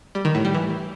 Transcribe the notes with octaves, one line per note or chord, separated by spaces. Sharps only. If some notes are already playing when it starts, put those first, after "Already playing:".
G3
D#3
A2
G3
E3